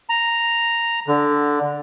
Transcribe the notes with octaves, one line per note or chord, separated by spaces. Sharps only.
A#5
D3